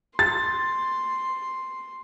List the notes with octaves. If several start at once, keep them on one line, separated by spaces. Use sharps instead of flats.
C6 A6